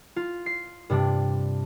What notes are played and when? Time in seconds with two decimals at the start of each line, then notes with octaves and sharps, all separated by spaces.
0.16 F4
0.46 C7
0.90 G2 C3 D4